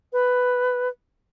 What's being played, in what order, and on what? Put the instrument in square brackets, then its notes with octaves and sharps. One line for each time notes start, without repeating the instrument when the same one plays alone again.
[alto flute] B4